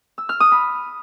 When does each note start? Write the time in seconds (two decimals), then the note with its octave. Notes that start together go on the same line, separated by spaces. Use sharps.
0.18 E6
0.29 F6
0.40 D#6
0.52 B5